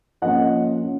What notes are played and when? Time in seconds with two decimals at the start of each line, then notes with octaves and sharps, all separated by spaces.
0.22 F3 A#3 C#4 D#5 F#5
0.84 C#4